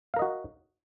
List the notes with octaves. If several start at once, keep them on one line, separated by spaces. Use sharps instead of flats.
F#4 A#4 D#5 F5